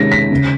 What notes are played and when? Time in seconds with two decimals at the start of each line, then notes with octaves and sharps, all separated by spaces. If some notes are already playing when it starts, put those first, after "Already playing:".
Already playing: C3 D#3 G#3 C#4 A#6
0.12 B6
0.31 C#3